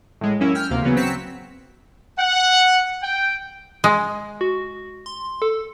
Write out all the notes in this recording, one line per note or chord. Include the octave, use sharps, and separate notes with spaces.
A2 G#3
F#2 A#3 C#4 E4
G5 F6
D2 C3 A#3
C#3 E3 F#3 B3
F#3 C4 B6 C#7 E7
F#5
G5
G#3
F#4
C6
A4